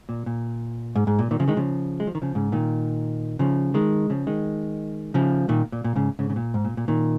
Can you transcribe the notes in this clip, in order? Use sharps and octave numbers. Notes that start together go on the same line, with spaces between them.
A#2
A#2
G#2
G#2
A#2
A#2 D#3
C#3 F3
D#3 G#3
C#3 F3
G#3
F3
D#3
C#3 F3
G#2 C#3
A#2 D#3
C#3 F3
D#3 G#3
C#3 F3
D#3 G#3
C#3 F3
A#2 D#3
A#2
A#2
G#2 C#3
G#2 C#3
C#3
A#2
G#2
A#2
A#2
A#2 D#3